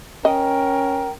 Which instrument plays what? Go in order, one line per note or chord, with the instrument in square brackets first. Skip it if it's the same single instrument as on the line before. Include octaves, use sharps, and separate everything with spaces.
[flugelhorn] C#4 [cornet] A#4 [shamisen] D#5 [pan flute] G5